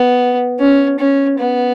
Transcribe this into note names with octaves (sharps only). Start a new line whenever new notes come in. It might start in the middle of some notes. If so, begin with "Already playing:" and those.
Already playing: B3
C#4
C#4
B3